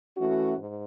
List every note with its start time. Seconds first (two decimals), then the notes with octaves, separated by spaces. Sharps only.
0.16 E3 A3 C#4 F#4
0.56 G#2